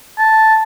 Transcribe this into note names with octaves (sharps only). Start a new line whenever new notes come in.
A5